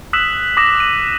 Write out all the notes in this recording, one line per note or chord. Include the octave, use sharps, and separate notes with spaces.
D#6 E6 F#6 B6 E7 F#7
D6 D#6 A#6 B6 E7
A#6 D#7 F#7